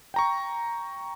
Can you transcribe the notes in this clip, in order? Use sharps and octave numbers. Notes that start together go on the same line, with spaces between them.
G5 A#5 C#6